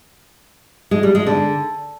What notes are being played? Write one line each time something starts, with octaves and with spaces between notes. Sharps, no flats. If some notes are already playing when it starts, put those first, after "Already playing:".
G#3
G3
G#3
D3